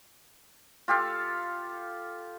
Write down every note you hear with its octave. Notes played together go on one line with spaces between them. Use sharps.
F4 G4 A4 F5